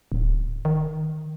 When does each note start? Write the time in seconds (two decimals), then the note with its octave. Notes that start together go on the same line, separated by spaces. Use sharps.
0.12 D1
0.65 D#3